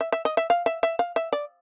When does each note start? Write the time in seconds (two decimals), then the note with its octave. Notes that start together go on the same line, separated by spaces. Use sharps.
0.01 E5
0.12 E5
0.25 D#5
0.37 E5
0.50 F5
0.66 E5
0.83 E5
0.99 F5
1.16 E5
1.33 D5